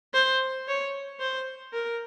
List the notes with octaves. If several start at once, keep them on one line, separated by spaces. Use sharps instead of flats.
C5
C#5
C5
A#4